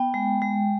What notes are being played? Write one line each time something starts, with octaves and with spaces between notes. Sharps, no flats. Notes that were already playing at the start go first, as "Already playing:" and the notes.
Already playing: B3 G5
G#3
G#3